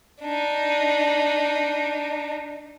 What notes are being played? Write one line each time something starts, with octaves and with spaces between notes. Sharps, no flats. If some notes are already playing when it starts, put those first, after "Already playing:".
D4 D#4